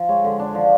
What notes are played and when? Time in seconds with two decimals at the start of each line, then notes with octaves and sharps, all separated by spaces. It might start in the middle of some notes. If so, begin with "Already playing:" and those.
Already playing: F3
0.09 G#3 C#5
0.24 D3
0.40 D4
0.55 F3